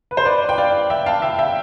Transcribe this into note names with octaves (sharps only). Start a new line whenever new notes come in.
B4
C5
B4 D5
G5
D5 F5
E5 G5
F5 A5
E5 G5
E5 G5